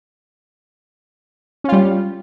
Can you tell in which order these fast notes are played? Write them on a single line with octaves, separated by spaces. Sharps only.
C#4 F4 G3